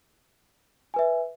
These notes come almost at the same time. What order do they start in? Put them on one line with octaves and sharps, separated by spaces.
G#5 B4 E5